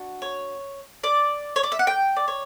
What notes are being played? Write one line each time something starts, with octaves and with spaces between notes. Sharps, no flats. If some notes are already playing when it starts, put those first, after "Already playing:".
Already playing: D4 F#4
C#5
D5
C#5
D5
E5
F#5
G5
D5
C#5